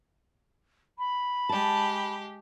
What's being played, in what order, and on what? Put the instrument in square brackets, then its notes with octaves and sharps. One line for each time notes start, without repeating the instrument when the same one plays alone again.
[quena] B5
[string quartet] G#3 G4 [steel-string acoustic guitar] A5